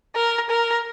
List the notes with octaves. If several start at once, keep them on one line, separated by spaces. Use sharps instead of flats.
A#4
A#4